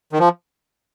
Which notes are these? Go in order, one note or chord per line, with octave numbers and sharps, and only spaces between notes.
D#3
F3